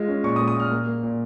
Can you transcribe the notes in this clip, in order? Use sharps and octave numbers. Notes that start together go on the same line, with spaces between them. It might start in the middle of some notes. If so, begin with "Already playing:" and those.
Already playing: G#3 F4
C#4
A#2 C#6
D#6
G#3
D#6
A#2 F6
A#3
A#3
A#2